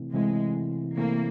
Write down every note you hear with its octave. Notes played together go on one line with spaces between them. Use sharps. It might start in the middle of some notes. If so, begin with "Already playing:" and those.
Already playing: C3 E3 A3 C4 E4
C3 E3 G#3 A3 C4 E4
C3 E3 A3 A#3 C4 E4